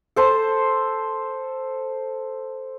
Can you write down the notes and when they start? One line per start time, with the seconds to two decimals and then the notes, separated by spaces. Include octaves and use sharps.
0.16 A4 C5 A5